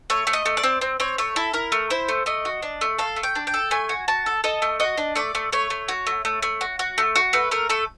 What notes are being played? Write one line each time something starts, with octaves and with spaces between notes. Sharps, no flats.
A3 C#5
A3
D#5
A3
D5
C4
C4
C4 C#5
A3 C#5
E4 A4
E4 A#4
A3
E4 C5
A3
A3 D#5
F#4
D4
A3
A4 F5
A3
G5
D4
G5
A4
A3 G#5
F#4
F#4 A5
A4
A4 D#5
A3
F#4 D#5
D4
A3 D5
A3
A3 C#5
A3
F#4
A3
A3
A3
F#4
F#4
A3
F#4
A3 B4
A3 A#4
A3 A4